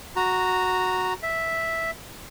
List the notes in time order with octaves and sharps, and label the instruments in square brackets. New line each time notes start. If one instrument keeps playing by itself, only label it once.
[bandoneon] F#4 A#5
E5